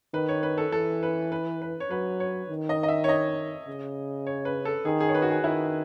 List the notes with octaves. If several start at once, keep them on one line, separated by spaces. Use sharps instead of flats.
D#3 B4
C#5
B4
A4
E3 A4
B4
B4
B4
C#5
F#3 B4
C#5
D#3
D#5
D#5
E5
C#5
D#5
C#3
C#5
B4
A4
D#3 G#4
G#4
C#5
B4
F#4
G#4
D#3 E4